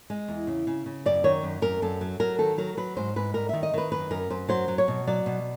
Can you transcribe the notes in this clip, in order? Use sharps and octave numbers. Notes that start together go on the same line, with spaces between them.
G#3
E2
C#3
C#3
C#3
F#2 D5
D#3 C#5
F#2
F#2 A#4
F#2 A4
F#3
F#3 A#4
D#3 A4
F#3 A#4
F#3 B4
G#2 C5
G#2 B4
G3 A#4
D#3 E5
D#5
D#3 B4
F#2 B4
F#2 A#4
F#2 C5
F#3 C5
F#3
C#5
B2
F#3 D5
B2